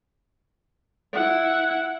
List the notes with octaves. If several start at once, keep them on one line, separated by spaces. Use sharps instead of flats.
E4 F#5